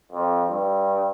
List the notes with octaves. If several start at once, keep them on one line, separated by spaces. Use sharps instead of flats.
F2
G2